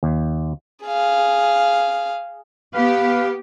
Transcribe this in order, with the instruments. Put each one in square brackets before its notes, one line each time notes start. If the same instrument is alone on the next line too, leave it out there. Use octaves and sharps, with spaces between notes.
[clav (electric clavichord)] D#2
[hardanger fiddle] G#4 F5
[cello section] B3 G4 [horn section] B4 F5